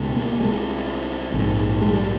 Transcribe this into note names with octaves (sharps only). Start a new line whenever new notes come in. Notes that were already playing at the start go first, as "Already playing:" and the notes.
Already playing: C#2 B2
A#3
C2 C3 G#3
A#1 G#2
G#3
G3